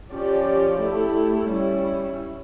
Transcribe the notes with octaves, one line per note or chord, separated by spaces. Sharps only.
F3 C#4 G4 D5
A3 E4 G4
G3 C#4 E4